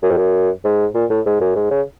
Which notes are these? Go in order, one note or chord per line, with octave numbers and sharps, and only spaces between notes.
F#2
F2
F#2
G#2
A#2
A2
G#2
F#2
G#2
C#3